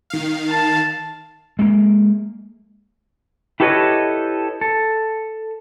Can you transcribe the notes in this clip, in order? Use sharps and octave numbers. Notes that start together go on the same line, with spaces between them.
D#3 F5
A5
G#3 A#3
E4 G4 A4 B4 C#5 D#5
A4